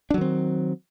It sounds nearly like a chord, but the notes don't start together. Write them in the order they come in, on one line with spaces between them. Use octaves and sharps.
D4 F#3 D#3 C4